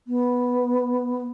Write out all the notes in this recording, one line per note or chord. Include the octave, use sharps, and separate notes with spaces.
B3